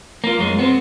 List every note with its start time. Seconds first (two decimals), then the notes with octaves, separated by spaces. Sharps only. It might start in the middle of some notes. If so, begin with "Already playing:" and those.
0.24 A#3 F4
0.39 F#2 G#3
0.59 B3 C4